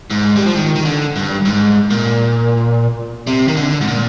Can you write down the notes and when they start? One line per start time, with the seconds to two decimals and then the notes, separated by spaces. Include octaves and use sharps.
0.10 G#2
0.36 G3
0.46 F3
0.56 D#3
0.76 D#3
0.85 D3
1.16 G2
1.45 G#2
1.91 A#2
3.27 C3
3.48 D#3
3.56 D3
3.81 G#2
3.88 A#2